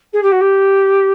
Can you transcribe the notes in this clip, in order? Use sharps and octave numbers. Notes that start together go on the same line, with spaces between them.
G#4
G4
F#4
G4